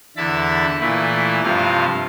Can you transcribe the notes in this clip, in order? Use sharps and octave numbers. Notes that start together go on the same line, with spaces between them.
E2 D3 E4 A5 B5
A#2 E3 A3 E4
G2 C3 F3 F5